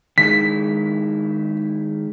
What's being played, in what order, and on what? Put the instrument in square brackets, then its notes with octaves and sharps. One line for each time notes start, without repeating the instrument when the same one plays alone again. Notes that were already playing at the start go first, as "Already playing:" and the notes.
[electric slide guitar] D#3 G#3 E4 [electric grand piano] B6